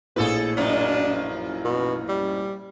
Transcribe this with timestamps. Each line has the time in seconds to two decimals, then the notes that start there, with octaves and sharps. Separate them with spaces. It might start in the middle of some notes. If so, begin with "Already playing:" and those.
0.16 A#1 A2 G#4 A4 B4
0.57 F#2 F3 D4 D#4
1.65 B2
2.09 G3